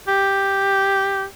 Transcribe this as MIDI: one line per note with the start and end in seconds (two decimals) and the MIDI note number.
0.08 1.25 67